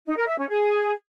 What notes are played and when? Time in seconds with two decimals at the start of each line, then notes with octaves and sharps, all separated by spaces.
0.07 D#4
0.17 A#4
0.28 E5
0.38 C#4
0.49 G#4